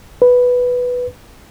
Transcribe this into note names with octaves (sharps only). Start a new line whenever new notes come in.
B4